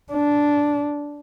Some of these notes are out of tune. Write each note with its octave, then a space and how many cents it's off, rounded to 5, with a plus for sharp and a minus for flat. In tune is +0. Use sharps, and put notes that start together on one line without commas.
D4 -10